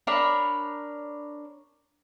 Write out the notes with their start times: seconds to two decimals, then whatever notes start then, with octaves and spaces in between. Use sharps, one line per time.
0.07 D4 A#4 C#5 B5